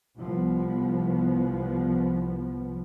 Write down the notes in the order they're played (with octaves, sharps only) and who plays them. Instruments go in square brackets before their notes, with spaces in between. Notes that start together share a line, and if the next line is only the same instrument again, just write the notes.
[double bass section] C2 F3 B3